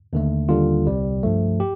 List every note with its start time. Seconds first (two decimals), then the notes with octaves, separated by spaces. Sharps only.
0.13 D#2 D3 A3
0.49 D#2 D3 G3 F4
0.86 C2 C3 G3
1.23 G2 F3 A3
1.60 G4